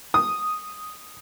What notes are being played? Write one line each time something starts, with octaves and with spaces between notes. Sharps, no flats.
D#6